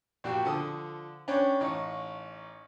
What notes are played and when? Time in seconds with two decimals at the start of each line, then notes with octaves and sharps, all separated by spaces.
0.24 A#1 F#4 G4
0.45 D3 F3 A4 D#6
1.28 C#4 D4 B4 C#5 G5
1.60 A1 D#4 C#5